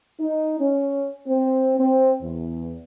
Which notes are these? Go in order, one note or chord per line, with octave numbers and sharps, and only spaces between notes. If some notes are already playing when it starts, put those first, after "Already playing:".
D#4
C#4
C4
C4
E2